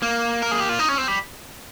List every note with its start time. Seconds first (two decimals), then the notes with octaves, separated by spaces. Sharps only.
0.02 A#3
0.42 A#4
0.51 G#4
0.60 G4
0.69 F4
0.79 D#4
0.89 C#4
0.98 C4
1.08 G3